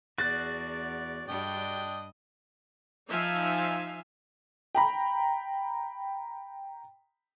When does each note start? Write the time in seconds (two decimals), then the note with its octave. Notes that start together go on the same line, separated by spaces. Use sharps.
0.18 E2 F#4 G#4 D5 F#6 A6
1.29 G2 G3 D4 D#5 G5
3.09 F3 D#4 E5 F5 G#5
4.75 G5 A#5 B5